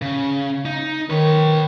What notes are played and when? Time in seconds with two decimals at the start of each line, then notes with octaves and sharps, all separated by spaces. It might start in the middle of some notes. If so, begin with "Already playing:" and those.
0.02 C#3
0.65 D#4
1.10 D#3 B4 C#5